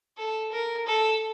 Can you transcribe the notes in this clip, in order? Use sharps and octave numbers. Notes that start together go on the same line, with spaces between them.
A4
A#4
A4